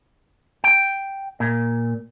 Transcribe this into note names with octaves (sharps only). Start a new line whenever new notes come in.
G5
A#2